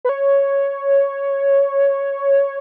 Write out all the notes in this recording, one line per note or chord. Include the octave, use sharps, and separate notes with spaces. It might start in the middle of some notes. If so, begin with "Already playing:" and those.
B4
C#5